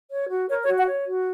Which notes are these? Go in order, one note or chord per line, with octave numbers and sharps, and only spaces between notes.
C#5
F#4
A#4 C#5
C#5
F#4
F#5
C#5
F#4